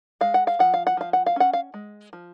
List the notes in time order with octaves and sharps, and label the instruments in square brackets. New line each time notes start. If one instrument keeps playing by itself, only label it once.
[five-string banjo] G#3 F5
F#5
F5
F3 F#5
F5
F#5
F3 F5
F#5
F5
C#4 F#5
F5
G#3
F3